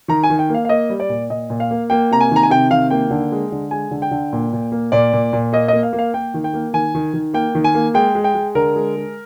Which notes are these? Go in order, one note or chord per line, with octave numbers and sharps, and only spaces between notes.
D#3 A#5
G#5
D#3
G5
A#3
F5
F5
A#3 D#5
G3
D5
A#2
A#2 D#5
A#2
F5
A#3
A#3 G5
C3 A#5
G#5
D#3 A#5
G#5
C3 G5
D#3 F5
A#3 G5
D3
G#3
D3
G#3 G#5
D3
G5
D3
A#2
A#2
A#3
A#2 D5
A#2
A#2
A#3 D#5
A#3 D#5
F5
A#3
F5
A#3 G5
D#3
G5
A#3
D#3 G#5
D#3
D#3
A#3 G5
D#3
G#5
A#3
G#3 G5
G#3
G5
G#3
D3 A#4
G#3
G#3